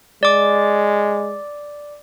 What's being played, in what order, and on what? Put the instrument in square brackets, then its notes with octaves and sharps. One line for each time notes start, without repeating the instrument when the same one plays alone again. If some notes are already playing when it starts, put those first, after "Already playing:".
[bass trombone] G#3 [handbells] D5 D6